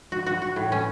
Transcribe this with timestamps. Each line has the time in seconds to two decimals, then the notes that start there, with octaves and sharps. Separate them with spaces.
0.12 F#4
0.27 F#4
0.42 F#4
0.56 A2
0.72 C#4